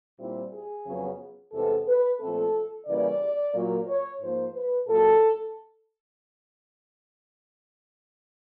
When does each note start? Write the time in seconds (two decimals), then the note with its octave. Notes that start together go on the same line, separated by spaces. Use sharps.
0.18 A#2 G3 C4 E4
0.52 G#4
0.85 F2 C#3 F#3 B3
1.52 E2 C3 E3 G#3 B3 A4
1.86 B4
2.19 A#2 F3 A3 C4 A4
2.86 C#3 E3 G3 A#3 D5
3.53 A#2 F#3 A#3
3.87 C#5
4.20 G#2 F3 A#3 C5
4.54 B4
4.87 A#2 F#3 A#3 A4